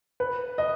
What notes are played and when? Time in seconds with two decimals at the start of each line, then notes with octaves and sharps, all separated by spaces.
0.20 B4
0.58 D#5